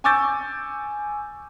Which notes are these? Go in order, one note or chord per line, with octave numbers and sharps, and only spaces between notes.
G#5 C#6 D6 E6 G6 A6